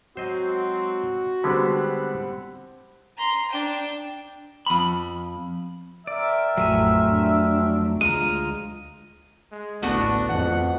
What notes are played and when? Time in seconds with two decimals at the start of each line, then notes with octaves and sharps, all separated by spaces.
0.17 F#3 G#3 C4 F#4 C5 D#5
1.44 D3 G3 G#3 B3 C4 F#5 B5
3.17 A#5 C6
3.50 D4 G5
4.66 F2 B5
6.07 C4 A#4 D5 E5
6.57 A1 F2 F#3 A3 G#5
7.10 F2 D4
8.01 D2 G#3 F4 A#5 D#7
9.52 G#3
9.82 A1 D2 A3 B3 D4 F#4
10.29 F2 F#5